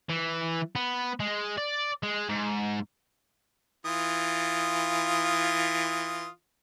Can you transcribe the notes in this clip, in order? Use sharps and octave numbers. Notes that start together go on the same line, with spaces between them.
E3
B3
G#3
D5
G#3
G#2
E3 F4 D#6